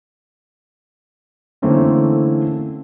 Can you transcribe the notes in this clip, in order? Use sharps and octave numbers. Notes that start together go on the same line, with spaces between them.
D3 E3 A3 A#3 C4 C#4